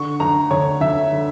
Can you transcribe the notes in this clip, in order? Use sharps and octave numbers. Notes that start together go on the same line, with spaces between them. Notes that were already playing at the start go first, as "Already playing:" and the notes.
Already playing: D3 C#6
D2 A#5
D2 C#5
D2 E5
D3